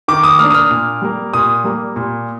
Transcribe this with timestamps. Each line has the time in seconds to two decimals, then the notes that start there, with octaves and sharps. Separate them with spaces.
0.08 D#3 D6
0.23 D#6
0.39 A#3 D4 F6
0.50 D#6
0.54 F6
0.71 A#2
1.02 G3 A#3
1.34 A#2 D#6
1.64 G3 A#3
1.96 A#2